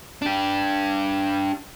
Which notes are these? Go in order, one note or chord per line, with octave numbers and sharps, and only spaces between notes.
D4 G4